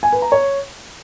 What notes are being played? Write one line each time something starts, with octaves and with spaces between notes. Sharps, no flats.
G#5
B4
A#5
C#5